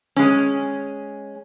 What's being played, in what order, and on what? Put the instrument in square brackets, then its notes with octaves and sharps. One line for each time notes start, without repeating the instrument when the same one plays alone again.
[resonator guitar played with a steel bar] G#3 C#4